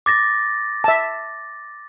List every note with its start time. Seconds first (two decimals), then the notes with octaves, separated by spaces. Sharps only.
0.06 D6 A6 A#6
0.84 E5 A5